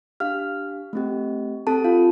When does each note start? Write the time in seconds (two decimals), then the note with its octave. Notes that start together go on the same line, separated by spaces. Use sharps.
0.20 D4 G4 F5 F6
0.93 A3 C4 G4
1.67 C4 G4 A4 A5
1.84 F4 F5